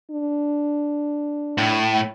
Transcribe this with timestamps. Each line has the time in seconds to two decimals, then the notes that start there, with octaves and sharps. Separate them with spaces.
0.11 D4
1.58 A2